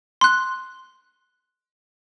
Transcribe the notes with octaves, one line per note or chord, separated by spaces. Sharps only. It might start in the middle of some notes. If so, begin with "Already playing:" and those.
C6 F#6